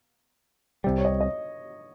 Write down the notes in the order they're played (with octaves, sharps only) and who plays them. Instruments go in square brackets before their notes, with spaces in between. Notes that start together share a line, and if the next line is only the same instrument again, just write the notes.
[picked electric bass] C2 C3 G3
[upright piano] C#5
D#5
D#5